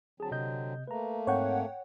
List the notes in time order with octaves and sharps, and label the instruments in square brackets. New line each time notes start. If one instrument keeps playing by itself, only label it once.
[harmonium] D3 F#3 C4 [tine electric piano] G#4 A5
[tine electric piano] C3 D#5 G6
[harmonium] A3 A#3 [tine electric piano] B4 A#5
[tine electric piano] G#2 C4 C#6 [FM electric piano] C#5 F#5 G5